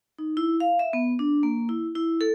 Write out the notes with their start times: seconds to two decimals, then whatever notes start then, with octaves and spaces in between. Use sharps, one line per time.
0.18 D#4
0.37 E4
0.60 F5
0.79 E5
0.93 B3
1.19 D4
1.43 A#3
1.69 E4
1.95 E4
2.21 A4